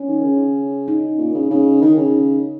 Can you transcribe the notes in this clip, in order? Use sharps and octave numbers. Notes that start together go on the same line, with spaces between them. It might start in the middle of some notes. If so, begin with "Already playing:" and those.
Already playing: C#4
D#3
C#3
D#4
A#2
C#3
C#3 D#4
D#3
C#3